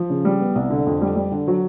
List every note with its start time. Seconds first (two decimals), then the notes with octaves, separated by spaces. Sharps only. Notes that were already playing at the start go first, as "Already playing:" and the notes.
Already playing: F3
0.10 C#3
0.25 G3
0.41 B3
0.55 C2
0.70 D3
0.87 F2
1.01 G3
1.16 G3
1.32 D3
1.48 F#3